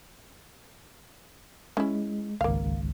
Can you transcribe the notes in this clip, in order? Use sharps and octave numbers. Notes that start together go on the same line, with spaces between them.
G#3 C#4 E4
G#1 C#2 A#3 F5